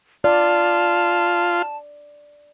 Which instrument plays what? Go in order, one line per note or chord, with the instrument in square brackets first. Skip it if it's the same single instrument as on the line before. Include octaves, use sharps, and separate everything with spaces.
[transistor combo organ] F4 [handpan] D5 [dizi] A5